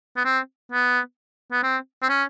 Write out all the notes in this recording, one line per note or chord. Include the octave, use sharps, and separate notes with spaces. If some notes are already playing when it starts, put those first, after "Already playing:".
B3
C4
B3
B3
C4
C4
C#4